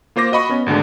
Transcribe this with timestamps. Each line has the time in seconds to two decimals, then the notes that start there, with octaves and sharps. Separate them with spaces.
0.16 A#3 F4 C5 D6 A#6
0.32 F#4 D#5 B5 C#6
0.49 B3 C#4
0.66 G#1 D2 D3 G#3